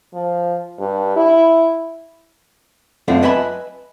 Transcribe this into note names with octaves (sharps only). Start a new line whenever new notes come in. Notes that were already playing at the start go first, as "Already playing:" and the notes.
F3
G2
E4
F#2 A3 B3 C4 D4 F4
B4 D#5 E5 G#5 A5 B5